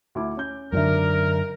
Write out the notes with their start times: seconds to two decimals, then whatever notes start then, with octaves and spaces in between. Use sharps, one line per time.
0.15 D2 E4 D6
0.37 C#4 G6
0.73 G#1 F#2 D3 D4 A#4 E5